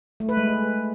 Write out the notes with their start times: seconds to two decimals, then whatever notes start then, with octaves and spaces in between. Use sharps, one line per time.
0.20 A3
0.29 B4
0.37 G#3